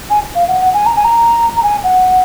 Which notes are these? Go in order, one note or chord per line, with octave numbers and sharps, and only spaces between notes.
G#5
F5
F#5
F#5
G#5
A#5
G#5
A#5
A#5
G#5
F#5